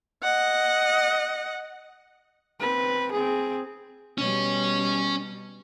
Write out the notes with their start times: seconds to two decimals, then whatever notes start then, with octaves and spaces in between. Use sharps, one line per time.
0.23 D#5 F#5
2.60 C4 B4
3.12 C4 G#4
4.18 B2 G3 C#4 C#5